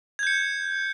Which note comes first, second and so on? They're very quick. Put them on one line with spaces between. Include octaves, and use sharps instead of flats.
G#6 G6 C#7